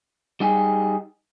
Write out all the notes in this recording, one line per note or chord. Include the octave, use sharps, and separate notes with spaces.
G3 D#4 G4 G#4